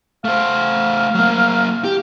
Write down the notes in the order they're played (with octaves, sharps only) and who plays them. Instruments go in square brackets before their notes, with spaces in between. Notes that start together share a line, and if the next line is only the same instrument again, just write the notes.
[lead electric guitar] A3 C5 [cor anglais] F5
[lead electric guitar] F#3 A#3
G4